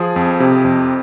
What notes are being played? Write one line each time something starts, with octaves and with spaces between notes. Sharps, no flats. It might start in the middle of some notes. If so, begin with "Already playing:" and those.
Already playing: F3 G#4
F2
C3
F2